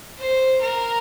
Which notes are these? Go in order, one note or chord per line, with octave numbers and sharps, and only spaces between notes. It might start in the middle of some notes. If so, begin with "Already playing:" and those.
C5
A#4